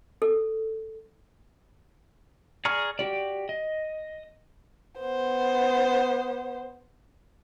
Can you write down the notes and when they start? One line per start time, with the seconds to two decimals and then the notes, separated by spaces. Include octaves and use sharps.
0.22 A4
2.65 G#4 D5 A#5 C#6 F6
2.99 F#4 G4 D5
3.49 D#5
5.00 B3 C5